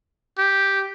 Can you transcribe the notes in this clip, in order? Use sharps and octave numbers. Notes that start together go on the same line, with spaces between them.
G4